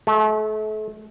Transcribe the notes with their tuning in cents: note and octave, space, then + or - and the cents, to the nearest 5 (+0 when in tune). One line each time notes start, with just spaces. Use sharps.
A3 -40